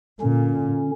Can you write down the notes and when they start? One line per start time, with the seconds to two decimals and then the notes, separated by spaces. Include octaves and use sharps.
0.21 A#2 D3 C#4